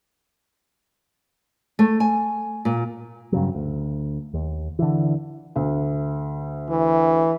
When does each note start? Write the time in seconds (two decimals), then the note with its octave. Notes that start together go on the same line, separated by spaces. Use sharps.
1.79 A3
2.00 G#5
2.65 A#2
3.32 G2 C#3 F#3
3.55 D2
4.34 D#2
4.79 D3 E3
5.56 D2
6.69 E3